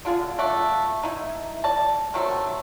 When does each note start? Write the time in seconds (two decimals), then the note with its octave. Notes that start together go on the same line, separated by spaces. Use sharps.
0.05 D3 F4 G#4
0.39 A3 D5 F#5
1.03 D#4 E4
1.64 D5 A5
2.14 D#3 F#3 A3 C4